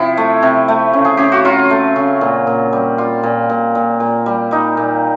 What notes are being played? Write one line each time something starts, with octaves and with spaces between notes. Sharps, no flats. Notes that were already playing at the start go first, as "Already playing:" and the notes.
Already playing: C3 F3 E4
A3
C3
A3
C#3
G#4
C#3 G4
F#4
F#3 F4
A3
C#3
A#2
A#2
G3
G3 F4
A#2
A#2
A#2
A#2
G3
G3 D#4
A#2